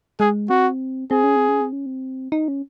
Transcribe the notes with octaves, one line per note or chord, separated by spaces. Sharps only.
G#3 G#4
C4 F#4
C4 G#4
C#4
C4
C#4
C4
C#4
C4
D#4
C#4